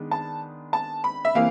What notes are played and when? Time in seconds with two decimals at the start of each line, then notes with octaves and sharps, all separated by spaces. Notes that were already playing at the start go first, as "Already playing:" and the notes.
Already playing: D#3 G#3 B3 D4
0.11 A5
0.73 A5
1.04 B5
1.25 E5
1.35 C3 E3 A#3 F5